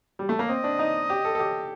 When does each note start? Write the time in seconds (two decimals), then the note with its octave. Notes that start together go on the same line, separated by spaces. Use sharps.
0.19 G3
0.29 A3
0.39 A#3
0.48 C4 D#5
0.64 D4
0.79 D#4
1.10 G4
1.25 A4
1.35 A4
1.40 G4